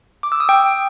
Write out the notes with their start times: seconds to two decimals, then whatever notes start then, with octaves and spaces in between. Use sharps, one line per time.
0.23 D6
0.32 E6
0.40 D#6
0.49 G5